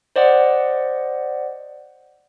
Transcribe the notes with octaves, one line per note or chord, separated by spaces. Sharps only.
C5 D5 D#5 F#5